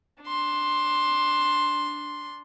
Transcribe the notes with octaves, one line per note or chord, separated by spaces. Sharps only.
D4 C6